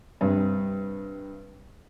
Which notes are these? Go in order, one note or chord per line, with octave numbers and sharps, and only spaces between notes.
G2 C3